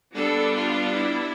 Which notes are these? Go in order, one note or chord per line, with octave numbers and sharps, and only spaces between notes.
G3 B3 D4 A4
F4
E4